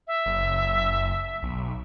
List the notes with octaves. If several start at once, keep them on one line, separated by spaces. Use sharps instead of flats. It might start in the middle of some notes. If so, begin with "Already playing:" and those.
E5
F#1
B1